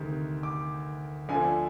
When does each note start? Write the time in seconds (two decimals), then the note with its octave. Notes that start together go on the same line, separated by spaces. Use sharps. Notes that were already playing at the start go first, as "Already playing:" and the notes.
Already playing: D2 C3 D#3
0.43 D6
1.29 D2 D3 F3 G#5